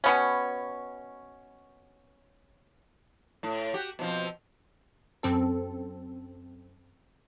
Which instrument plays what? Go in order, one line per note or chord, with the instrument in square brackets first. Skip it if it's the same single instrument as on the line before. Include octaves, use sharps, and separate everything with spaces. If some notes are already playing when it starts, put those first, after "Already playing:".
[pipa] B2 B3 C#4
[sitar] A2
F#4 G4
B2 F3 C4
[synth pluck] F#2 C4 A4